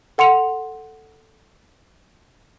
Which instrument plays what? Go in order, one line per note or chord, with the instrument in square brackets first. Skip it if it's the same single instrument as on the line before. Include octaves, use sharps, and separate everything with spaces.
[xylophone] A4 F#5 C6 C#7 F7